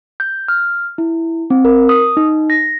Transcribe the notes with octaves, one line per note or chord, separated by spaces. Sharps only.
G6
F6
E4
C4
A#4
D#6
D#4
A#6